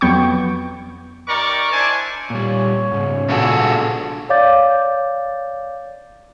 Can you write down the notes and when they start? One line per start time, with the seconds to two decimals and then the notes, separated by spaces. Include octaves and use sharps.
0.01 F2 F#3 B3 G5 C#6
1.28 D#4 G4 A#4 D5 A#5 C#6
1.71 D4 E4 C5 G#5 A5 D6
2.30 A#2 G3 C#5
2.92 G#2 C#3
3.30 A#2 D4 F#4 G#4 A4
4.29 C#5 D5 F5 D6 G6 A6